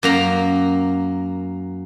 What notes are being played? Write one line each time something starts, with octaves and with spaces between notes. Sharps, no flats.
F#2 A#3 A#5